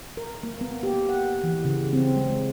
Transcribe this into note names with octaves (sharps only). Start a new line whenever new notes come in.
A#4
A#3
B3
G4
F#5
E3
C#3
C4
G#3